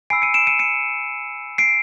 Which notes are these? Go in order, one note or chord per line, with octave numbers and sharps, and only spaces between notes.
G#5 B5 E6 C7 D7
C#7 D#7
D7 E7
C#7 D#7
C#7 D#7
C7 D7